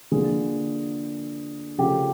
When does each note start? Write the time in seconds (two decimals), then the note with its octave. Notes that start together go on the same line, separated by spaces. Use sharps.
0.12 D3 F3 A#3 G#4
1.78 C#3 F3 A3 G4